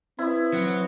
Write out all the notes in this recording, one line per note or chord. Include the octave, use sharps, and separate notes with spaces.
C4 E4 B4 D#6
F#3